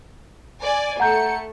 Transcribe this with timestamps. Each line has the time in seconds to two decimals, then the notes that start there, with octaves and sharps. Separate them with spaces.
0.62 D5 G#5
1.00 A3 F#5 A#5 G6 C#7